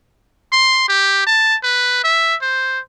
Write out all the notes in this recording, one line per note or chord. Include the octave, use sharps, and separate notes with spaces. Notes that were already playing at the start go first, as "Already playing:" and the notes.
C6
G4
A5
B4
E5
C5